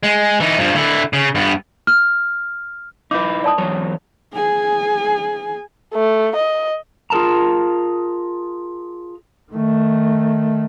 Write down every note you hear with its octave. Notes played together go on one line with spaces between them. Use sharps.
G#3
E3 D#4
G2 F3
D3 E4
C#3
G2 B3
F6
D#4 E4 B4 D6
D5 A5 D#6
E2 F#3 C#5
G#4 G#5
A3
D#5
F4 G#4 A#4 A5 A#5
D#3 A3